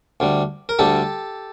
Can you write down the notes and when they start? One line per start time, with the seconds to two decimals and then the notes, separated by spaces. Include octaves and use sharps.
0.20 D2 D3 G3
0.69 A#4
0.79 D2 D3 G3 G4 A4